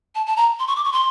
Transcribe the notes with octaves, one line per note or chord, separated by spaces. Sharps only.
A5
A5
A#5
C6
C#6
D6
C#6
C6